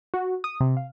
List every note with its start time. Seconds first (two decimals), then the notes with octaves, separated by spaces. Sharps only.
0.14 F#4
0.44 D#6
0.60 C3
0.77 F5